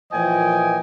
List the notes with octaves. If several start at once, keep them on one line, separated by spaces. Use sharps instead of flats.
A#2 E3 F3 D#5 G5 G#5